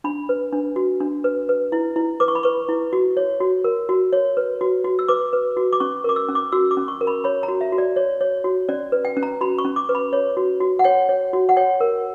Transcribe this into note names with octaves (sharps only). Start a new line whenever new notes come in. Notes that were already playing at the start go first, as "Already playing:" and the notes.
D4 B5
B4
D4
F#4
D4
B4
B4
E4
E4
B4 D6
C#6
B5
B4 C#6
E4
F#4
C#5
F#4
A#4
F#4
C#5
B4
F#4
F#4
E6
B4 D6
B4
F#4
D6
C#4 C#6
A#4 D6
E6
C#4
D6
F#4 E6
D6
C#4
C#6
A#4
B5
C#5 B5
A#5
F#4
E5
F#4
D5
C#5
C#5
F#4
C#4 D5
B4
G5
C#4
A#5
F#4 B5
C#6
C#4
D6
B4
B5
C#5
F#4
F#4
F#5
C#5 G5
C#5
F#4
F#5
C#5 G5
A#4